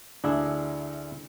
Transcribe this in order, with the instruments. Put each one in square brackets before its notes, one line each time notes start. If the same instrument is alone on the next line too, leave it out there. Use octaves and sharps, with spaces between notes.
[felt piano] D2 [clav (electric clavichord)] D4 E4 G#4